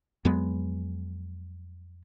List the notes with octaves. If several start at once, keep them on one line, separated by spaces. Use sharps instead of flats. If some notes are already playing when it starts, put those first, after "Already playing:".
F2 F#3 G#3 B3